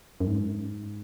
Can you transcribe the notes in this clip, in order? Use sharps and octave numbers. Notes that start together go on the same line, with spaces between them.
F#2
G#2